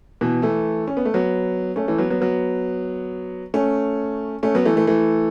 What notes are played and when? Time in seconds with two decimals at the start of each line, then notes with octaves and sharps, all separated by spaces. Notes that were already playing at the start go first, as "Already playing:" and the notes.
0.21 B2 E3
0.42 E3 A3
0.87 C#4
0.97 B3
1.05 A3
1.14 F#3 B3
1.76 A3 C#4
1.88 E3 A3
1.98 F#3 B3
2.10 F#3 B3
2.21 F#3 B3
3.54 A3 C#4
4.43 A3 C#4
4.55 F#3 B3
4.65 E3 A3
4.76 E3 A3
4.87 E3 A3